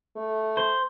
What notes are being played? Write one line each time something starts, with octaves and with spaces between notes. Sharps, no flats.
A3
C5